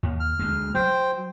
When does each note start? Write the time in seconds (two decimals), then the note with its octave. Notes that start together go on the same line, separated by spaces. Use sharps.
0.03 D#2
0.20 F6
0.39 D2 G#3
0.75 F#3 C5 G5